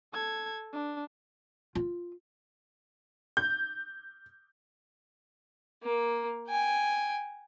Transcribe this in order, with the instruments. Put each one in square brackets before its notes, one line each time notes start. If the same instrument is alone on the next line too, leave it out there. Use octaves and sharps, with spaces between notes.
[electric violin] A4 G#6
D4
[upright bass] F4
[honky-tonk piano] G6
[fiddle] A#3
G5 G#5